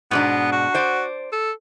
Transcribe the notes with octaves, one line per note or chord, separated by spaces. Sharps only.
G#2 B2 B3 D4
F#4
C5 D5
A4